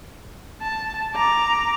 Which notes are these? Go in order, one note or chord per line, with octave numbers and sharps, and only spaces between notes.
A5
A#5 D6